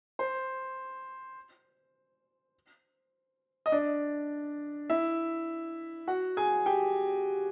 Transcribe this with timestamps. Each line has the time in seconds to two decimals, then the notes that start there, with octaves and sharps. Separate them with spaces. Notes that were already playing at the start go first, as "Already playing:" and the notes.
0.19 C5
3.66 D#5
3.72 D4 D5
4.90 E4 E5
6.07 F#4 F#5
6.37 G#4 G#5
6.66 G4 G5